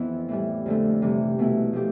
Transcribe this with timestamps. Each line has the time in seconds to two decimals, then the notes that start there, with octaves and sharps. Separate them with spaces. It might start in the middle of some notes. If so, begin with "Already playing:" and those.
Already playing: F2 E3 B3 E4
0.28 A2 E3 G3
0.66 F2 D3 A3
1.02 C3 E3 G3
1.39 B2 A3 E4
1.73 F3 A3 G4